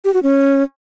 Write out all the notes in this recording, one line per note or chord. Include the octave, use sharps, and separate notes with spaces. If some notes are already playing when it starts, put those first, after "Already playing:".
G4
F#4
C#4